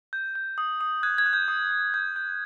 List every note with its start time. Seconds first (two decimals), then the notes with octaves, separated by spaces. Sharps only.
0.13 G6
0.35 G6
0.58 D#6
0.81 D#6
1.03 F#6 G#6
1.18 G#6
1.26 F#6
1.33 G6
1.48 D#6
1.71 D#6
1.94 G6
2.16 G6